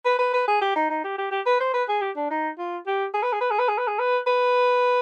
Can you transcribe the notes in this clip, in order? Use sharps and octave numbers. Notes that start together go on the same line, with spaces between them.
B4
B4
B4
G#4
G4
D#4
D#4
G4
G4
G4
B4
C5
B4
G#4
G4
D4
D#4
F4
G4
G#4
B4
G#4
B4
G#4
B4
G#4
B4
G#4
B4
B4